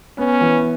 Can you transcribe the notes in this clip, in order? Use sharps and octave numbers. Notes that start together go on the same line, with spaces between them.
B3 C#4
E3